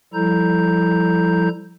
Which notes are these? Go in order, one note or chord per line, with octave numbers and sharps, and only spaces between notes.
F3 G3 E4 A4 A#5 G6